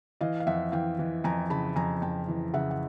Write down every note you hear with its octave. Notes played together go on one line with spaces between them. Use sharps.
E3 D#5 F5
F5
F2 E5 F#5
E3 F5 G5
E3
F2 G#5 A#5
C#3 A5 B5
F2 G#5 A#5
F2 G5 A5
E3
C#3 E5 F#5
F#5